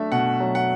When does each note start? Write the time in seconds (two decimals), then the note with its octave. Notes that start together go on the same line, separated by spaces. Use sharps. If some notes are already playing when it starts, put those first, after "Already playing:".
Already playing: F#3 A3 D4 E5
0.12 B2 F#5
0.40 F#3
0.55 F#5